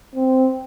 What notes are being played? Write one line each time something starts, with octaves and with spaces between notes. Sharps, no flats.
C4